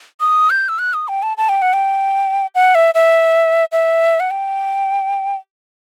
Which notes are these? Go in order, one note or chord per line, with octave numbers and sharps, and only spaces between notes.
D#6
G6
E6
F#6
D#6
G5
A5
A5
G5
F#5
G5
F#5
E5
E5
E5
F#5
G5